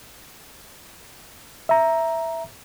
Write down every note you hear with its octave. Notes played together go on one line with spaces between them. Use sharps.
E5 A#5